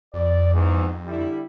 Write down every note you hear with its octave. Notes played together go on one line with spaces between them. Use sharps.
F2 D5
E2 G#2
D3 G3 E4